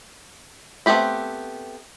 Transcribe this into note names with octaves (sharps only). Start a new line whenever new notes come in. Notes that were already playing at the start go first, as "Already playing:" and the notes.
A3 B3 C4 G4 B5